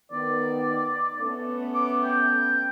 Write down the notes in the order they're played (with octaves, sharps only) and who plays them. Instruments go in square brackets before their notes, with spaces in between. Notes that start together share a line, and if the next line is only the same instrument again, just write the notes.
[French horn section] D#3 B3 [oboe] D5
[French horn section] A3 B3 C#4
[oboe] D6
G5